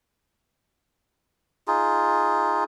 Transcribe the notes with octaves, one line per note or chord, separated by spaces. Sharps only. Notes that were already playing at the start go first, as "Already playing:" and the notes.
D#4 F4 G#4